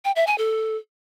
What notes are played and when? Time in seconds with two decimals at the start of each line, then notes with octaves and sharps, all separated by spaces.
0.05 G5
0.16 E5
0.27 G#5
0.38 A4